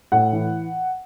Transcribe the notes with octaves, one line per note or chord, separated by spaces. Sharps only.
A2 F#5
E3